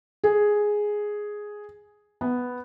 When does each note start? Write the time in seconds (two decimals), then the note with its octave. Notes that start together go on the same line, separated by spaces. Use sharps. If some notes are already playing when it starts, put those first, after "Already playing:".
0.24 G#4
2.21 B3